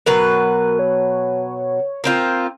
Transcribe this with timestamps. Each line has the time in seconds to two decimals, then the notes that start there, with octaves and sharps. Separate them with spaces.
0.06 B2 F#3 A#4 B4
0.79 C#5
2.04 A#3 C4 F4